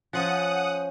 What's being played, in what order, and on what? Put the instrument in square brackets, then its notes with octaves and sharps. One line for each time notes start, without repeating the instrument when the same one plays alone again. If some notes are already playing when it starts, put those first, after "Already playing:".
[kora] F3 [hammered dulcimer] C#4 C5 [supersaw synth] F#5 D#6